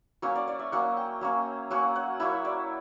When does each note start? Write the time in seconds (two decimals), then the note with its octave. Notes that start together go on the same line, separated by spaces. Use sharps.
0.22 F#3 A#3 C#4 C#5
0.35 D5
0.48 D5
0.59 E5
0.72 F#3 A#3 C#4 F#5
0.97 G5
1.21 F#3 A#3 C#4
1.71 F#3 A#3 C#4 F#5
1.96 F#5
2.20 F#3 A#3 E4 E5
2.45 D5